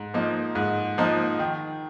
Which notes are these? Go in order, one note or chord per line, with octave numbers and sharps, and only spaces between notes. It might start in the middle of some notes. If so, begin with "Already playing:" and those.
Already playing: G#2
F3 A#3 D#4
G#2
F3 A#3 D#4
D#3